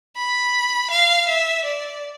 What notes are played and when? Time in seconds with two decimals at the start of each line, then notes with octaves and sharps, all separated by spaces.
0.16 B5
0.91 F5
1.28 E5
1.65 D5